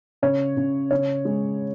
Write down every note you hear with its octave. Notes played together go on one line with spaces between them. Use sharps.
C#3 C#5
C#3
C#3 C#5
G#3